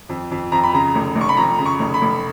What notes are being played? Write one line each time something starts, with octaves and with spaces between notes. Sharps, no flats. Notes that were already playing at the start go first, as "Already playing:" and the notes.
F2
F2
F2 A#5
B5
C#3 A#5
F1
F1
C#6
B5
F2 A#5
C#3
C#6
F1
B5
F1